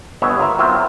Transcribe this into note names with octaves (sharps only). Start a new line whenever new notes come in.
G1 B3 C#5 D#5 E5 G#5
F4 A#4 E5
F#3 B3 C4 E4 F4